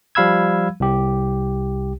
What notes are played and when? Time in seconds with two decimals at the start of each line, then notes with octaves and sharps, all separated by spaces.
0.15 F3 G3 F5 B5 E6 G#6
0.80 C2 G4